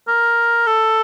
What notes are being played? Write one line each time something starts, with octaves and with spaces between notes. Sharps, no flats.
A#4
A4